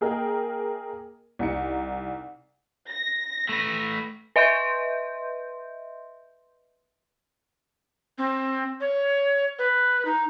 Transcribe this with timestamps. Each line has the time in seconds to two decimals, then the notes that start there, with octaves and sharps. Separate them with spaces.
0.01 A#3 G#4 A#4 D#5 G5
1.39 C2 D#4 C#7
2.89 A#6
3.49 A3 B4
4.36 B4 D#5 E5 C6 G6
8.18 C4
8.81 C#5
9.59 B4
10.05 D#4